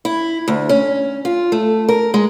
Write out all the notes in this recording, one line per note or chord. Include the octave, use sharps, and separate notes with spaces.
E4
D2
C#4
F4
A3
A#4
G#3